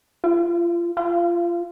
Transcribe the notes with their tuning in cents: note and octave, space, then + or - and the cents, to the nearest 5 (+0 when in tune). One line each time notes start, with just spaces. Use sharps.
F4 -30
F4 -20